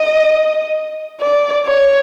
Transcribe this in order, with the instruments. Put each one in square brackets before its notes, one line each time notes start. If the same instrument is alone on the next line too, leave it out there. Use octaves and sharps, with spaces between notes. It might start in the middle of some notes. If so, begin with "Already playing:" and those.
Already playing: [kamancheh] D#5
D5
C#5